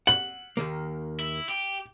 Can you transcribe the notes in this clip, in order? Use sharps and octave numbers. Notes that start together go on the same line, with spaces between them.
F#5 F#7
D#2 D#3 A#3
E4
G4